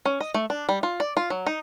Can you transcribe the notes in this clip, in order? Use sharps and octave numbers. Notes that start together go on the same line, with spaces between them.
C#4
D#5
A3
D4
G3
F4
D5
F4
F#3
D#4